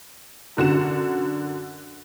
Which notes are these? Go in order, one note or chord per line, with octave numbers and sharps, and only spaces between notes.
F#2 D3 F#4 E7